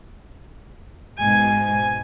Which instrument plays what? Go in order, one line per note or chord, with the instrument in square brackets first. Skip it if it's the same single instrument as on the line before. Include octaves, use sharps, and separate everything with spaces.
[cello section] G#2 B2 [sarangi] G#5